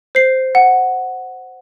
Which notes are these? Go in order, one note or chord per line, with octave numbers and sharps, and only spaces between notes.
C5 C7
F#5